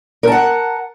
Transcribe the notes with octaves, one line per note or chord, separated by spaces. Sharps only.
A#4 F#5 A5